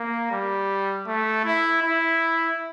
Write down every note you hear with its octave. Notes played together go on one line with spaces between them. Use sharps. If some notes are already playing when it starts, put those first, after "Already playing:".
Already playing: A#3
G3
A3
E4
E4